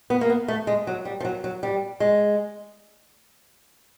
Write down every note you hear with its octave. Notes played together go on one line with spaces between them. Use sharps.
B3
A#3
B3
A3
G#3
F#3
G3
F3
F#3
F#3
G3
G#3